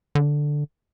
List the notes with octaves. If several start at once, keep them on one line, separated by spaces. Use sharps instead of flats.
D3